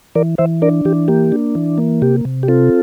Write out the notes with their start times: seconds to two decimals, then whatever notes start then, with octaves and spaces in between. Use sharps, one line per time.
0.15 E3 A#4 D5
0.38 E3 C5 E5
0.62 D4 A#4 D5
0.85 E3 G4
1.08 A#3 G4
1.32 D4
1.55 E3
1.78 A#3
2.02 C3 G4
2.25 C3
2.43 G4
2.48 C4 F4 A4